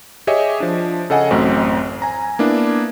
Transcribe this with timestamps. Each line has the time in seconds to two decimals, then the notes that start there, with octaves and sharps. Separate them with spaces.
0.27 G4 G#4 C#5 D#5 E5
0.60 F3 D4
1.10 C#3 A4 D#5 F#5 G#5
1.31 A1 F#2 A3 C4
2.02 G#5 A#5
2.39 A#3 B3 D4 E4